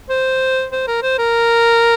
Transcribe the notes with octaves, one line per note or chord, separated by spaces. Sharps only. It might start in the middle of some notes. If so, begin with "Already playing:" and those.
C5
C5
A#4
C5
A#4